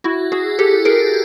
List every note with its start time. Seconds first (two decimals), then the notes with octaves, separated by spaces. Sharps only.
0.04 E4 F#4
0.32 F#4 G#4
0.59 G4 A4
0.85 G#4 A#4